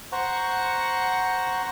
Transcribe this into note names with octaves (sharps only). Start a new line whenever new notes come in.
C5 F#5 A#5 C#6